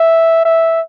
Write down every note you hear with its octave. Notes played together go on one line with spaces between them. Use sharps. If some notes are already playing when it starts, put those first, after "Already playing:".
Already playing: E5
E5